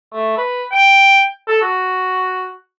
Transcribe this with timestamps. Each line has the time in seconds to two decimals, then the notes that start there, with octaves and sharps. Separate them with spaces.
0.13 A3
0.37 B4
0.72 G5
1.48 A4
1.62 F#4